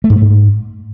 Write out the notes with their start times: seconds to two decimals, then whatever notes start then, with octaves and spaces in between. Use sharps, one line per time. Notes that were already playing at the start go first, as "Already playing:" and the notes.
0.04 A3
0.10 G#2
0.16 A3
0.22 G#2